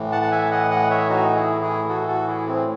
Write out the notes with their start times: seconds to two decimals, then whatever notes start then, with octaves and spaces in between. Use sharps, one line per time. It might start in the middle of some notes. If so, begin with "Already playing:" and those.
Already playing: A2 E3
0.12 F#5 A5
0.22 A5
0.31 E5 G#5
0.51 D#5 F#5
0.71 D#5 F#5
0.90 C#5 E5
1.09 D#4 F#4
1.36 E4 G#4
1.62 E4 G#4
1.89 F#4 A4
2.08 F#4 A4
2.27 E4 G#4
2.47 C4